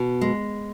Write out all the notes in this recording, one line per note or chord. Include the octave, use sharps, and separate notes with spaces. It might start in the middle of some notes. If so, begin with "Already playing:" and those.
Already playing: B2
G#3